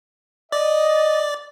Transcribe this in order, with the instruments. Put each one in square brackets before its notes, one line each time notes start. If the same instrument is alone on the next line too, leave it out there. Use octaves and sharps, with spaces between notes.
[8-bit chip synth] D5 [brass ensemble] D#5